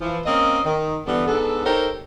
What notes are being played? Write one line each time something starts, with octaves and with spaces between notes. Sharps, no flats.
E3 F3
A#3 C4 C#4 D#5
D#3
D3 E3 G3 B3
G#2 B3 D4 A4
D#4 G4 A4 A#4 C5 C#5